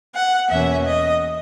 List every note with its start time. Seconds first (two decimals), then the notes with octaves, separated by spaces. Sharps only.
0.14 F#5
0.50 E2 B2 A#3 C#4 E5
0.86 D#5